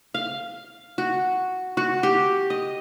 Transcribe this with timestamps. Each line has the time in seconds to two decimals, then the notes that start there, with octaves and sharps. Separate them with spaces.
0.14 F5
0.98 F#4
1.77 F#4
2.03 G4
2.50 D#5